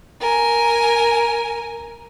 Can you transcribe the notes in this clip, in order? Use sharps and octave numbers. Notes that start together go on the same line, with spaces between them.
A#4 G#5